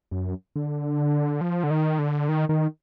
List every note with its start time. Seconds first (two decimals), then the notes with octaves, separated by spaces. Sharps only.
0.11 F#2
0.56 D3
1.41 F3
1.64 D3
1.71 D#3
1.99 D3
2.29 D#3
2.49 D#3